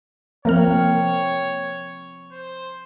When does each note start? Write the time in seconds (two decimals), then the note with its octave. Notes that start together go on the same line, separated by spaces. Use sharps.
0.45 F3 A#3 C4 A#4 C#5 F6
2.31 C5